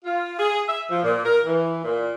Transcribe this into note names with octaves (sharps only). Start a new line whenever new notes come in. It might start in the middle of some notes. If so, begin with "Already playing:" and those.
F4
G#4
E5
F3
A#2
A#4
E3
A#2